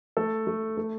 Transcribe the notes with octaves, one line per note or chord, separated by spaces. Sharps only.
A3 A4
A3
A3